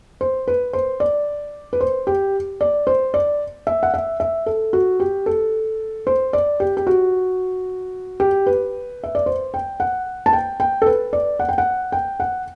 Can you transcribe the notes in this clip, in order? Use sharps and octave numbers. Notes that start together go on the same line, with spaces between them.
C5
B4
C5
D5
B4
C5
G4
D5
C5
D5
E5
F#5
E5
E5
A4
F#4
G4
A4
C5
D5
G4
G4
F#4
G4
B4
E5
D5
C5
G5
F#5
A5
G5
G5
A4
B4
D5
F#5
G5
F#5
G5
F#5